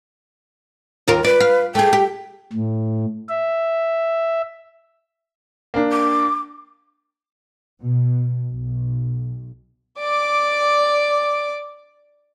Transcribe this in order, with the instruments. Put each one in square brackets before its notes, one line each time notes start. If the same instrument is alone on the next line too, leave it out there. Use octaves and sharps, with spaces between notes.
[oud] D#2 F4 A#4
[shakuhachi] B4 [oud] D5
[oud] F5
[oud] A3 G#4 [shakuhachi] G5
[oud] G4
[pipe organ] A2
E5
[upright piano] A#3 D4
[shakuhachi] D6
[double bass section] B2
B1
[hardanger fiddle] D5 D6